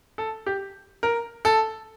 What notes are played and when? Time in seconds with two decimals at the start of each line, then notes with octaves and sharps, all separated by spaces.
0.18 A4
0.46 G4
1.03 A#4
1.45 A4